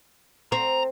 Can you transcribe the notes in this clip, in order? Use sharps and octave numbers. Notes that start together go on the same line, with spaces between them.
C4 A#5